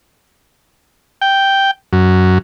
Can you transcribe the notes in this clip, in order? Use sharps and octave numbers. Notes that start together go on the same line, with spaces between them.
G5
F#2